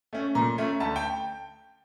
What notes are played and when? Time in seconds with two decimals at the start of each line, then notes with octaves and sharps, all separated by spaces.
0.13 A3 C#4
0.35 A#2 A#5
0.58 A3 C#4
0.80 D2 A5
0.96 G5